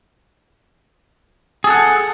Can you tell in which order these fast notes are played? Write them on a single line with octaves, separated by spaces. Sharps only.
G#4 A4 F#5